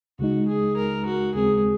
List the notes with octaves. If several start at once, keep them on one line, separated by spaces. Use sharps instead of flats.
C#2 C#3 G#3 D#4 F#4
G#4
A#4
F#4
D#2 C#3 G#3 C4 G#4